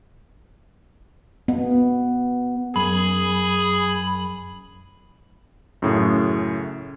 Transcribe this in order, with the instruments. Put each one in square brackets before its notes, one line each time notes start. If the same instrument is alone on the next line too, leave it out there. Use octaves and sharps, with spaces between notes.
[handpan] B3
[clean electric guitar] F#2 [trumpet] G#4 [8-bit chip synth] B5
[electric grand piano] F#2 A2 C#3